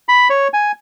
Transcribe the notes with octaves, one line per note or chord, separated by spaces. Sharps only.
B5
C#5
G#5